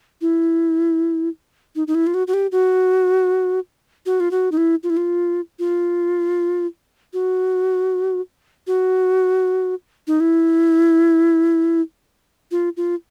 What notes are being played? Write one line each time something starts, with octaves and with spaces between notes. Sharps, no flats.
E4
D#4
D#4
E4
F4
F#4
F#4
G4
F#4
F#4
F4
F#4
D#4
E4
F4
E4
F4
F4
F#4
F#4
D#4
E4
F4
F4